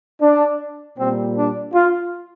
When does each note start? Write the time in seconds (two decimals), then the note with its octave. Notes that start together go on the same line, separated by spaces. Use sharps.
0.21 D4
0.97 A#2 G3 A#3 C4
1.36 D4
1.73 F4